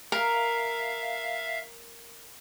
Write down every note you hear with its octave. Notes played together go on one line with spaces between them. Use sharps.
A#4 E5 F5